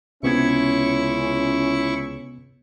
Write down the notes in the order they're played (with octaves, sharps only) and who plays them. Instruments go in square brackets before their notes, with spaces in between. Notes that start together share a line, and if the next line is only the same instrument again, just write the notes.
[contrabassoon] C#2 [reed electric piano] C3 B3 G#6 [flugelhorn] C#4 [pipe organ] E4 C#6